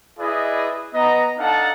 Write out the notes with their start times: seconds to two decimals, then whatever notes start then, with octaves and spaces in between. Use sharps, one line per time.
0.19 E4 G#4 B4 D5 D#5
0.94 B3 D#5 A#5
1.39 D4 D#4 A4 F5 F#5 A5